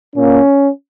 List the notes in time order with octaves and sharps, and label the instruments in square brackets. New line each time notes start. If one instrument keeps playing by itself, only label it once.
[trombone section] A#2 A#3 C#4